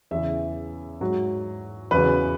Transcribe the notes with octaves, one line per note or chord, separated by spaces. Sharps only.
E2 C#3 E3 E5
G#2 F#3
E2 C#3 F#3 B4